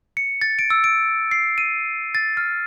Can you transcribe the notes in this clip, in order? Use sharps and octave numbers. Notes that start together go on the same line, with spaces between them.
C#7
A6
D7
E6
D7
C7
D#7
A6
F6